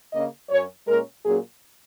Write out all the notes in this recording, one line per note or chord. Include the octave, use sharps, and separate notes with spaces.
C#3 A#3 C#4 D#5
F#2 F#3 C#4 C#5
A#2 G#3 C#4 A#4
A#2 F#3 A#3 C#4 G#4